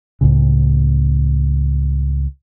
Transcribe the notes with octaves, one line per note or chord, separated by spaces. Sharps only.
C#2 A2 C#3